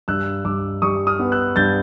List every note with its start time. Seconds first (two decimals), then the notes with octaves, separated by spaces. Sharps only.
0.08 G2 E6 F#6
0.45 G2 D6 E6
0.82 G3 C#6 D#6
1.07 D#6 F6
1.19 B3
1.32 E6 F#6
1.56 G2 G6 A6